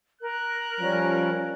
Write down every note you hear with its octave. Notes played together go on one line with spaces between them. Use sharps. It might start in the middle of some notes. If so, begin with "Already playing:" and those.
A#4 F#6
F3 G3 C#4